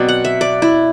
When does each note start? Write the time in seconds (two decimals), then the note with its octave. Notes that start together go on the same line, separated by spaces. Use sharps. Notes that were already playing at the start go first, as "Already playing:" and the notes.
Already playing: B2 F#3 C4 D5
0.08 F#5
0.25 E5
0.41 D5
0.62 E4